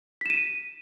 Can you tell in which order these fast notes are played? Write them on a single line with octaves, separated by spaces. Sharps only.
B6 E7 D#7